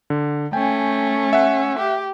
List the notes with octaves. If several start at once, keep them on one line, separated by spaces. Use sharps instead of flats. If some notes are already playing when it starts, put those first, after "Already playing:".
D3
A3 C#4 G5 G#5
E5 F#5
G4